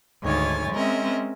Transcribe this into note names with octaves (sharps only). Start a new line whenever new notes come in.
D2 G#2 D#3 C#5 G#5 A6
G#3 C4 C#4 A#4 D#5 E5